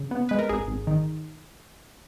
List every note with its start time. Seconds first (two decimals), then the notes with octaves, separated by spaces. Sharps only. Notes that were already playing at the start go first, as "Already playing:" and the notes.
Already playing: C#3
0.11 B3
0.29 G#3 B4
0.39 A#4
0.49 G#1 G#4
0.68 G#1
0.87 D#3